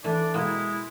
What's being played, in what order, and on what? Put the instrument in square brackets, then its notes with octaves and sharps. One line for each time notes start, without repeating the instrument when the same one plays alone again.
[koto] E3 A3 [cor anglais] D4
[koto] B2 A#3 G5 [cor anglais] G#3 [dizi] E4